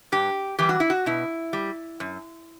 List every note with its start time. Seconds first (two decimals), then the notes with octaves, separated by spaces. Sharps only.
0.12 G2 G4
0.59 E3 G3 G4
0.69 F#4
0.80 E4
0.90 F#4
1.06 B2 E4
1.53 G3
2.00 F#2